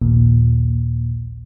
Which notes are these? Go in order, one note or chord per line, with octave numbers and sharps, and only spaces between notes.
A#1 D#2 A#2